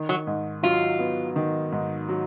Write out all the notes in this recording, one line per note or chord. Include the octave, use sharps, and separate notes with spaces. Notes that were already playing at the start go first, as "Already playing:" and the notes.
Already playing: D#3
F#3
G#2
F#3 F4
B3
D#3
G#2
F#3